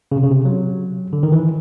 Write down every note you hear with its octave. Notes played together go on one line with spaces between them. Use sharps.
C#3
C3
C#3
C3
F#3
D3
D#3
E3